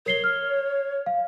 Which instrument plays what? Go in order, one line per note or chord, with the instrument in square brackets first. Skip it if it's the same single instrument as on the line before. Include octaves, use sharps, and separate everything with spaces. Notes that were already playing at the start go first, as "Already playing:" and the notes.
[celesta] A#4 C7 G7 [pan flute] C#5
[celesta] F6
F5